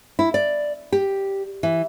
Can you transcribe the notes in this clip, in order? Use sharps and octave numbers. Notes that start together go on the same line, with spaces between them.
E4
D5
G4
E3